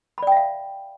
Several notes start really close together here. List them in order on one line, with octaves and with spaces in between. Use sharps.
B5 D5 G5 E5 F5